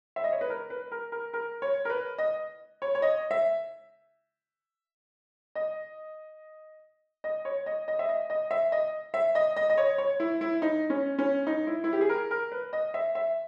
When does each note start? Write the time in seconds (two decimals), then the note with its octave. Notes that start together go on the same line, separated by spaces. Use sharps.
0.16 E5
0.24 D#5
0.32 C#5
0.41 B4
0.50 A#4
0.70 B4
0.92 A#4
1.12 A#4
1.33 A#4
1.62 C#5
1.85 A#4
1.90 B4
2.18 D#5
2.82 C#5
2.95 C#5
3.02 D#5
3.31 E5
5.55 D#5
7.24 D#5
7.45 C#5
7.66 D#5
7.88 D#5
7.99 E5
8.09 D#5
8.30 D#5
8.51 E5
8.72 D#5
9.14 E5
9.35 D#5
9.57 D#5
9.70 D#5
9.78 C#5
9.98 C#5
10.20 E4
10.41 E4
10.62 D#4
10.90 C#4
11.18 C#4
11.47 D#4
11.67 E4
11.84 E4
11.93 G4
12.01 G#4
12.09 A#4
12.31 A#4
12.52 B4
12.73 D#5
12.94 E5
13.15 E5